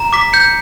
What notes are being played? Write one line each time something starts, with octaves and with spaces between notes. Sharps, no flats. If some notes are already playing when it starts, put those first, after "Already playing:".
Already playing: A#5
D6 B6
G6 C#7